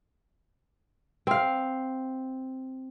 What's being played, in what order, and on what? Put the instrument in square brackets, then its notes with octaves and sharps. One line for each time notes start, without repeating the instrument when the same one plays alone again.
[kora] C4 F5